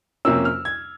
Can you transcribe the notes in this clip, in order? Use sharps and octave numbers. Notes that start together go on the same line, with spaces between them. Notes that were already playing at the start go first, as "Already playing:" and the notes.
F2 C3 F3 A#3 C#4 E6
F6
G#6